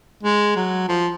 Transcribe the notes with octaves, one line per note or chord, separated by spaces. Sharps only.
G#3
F#3
F3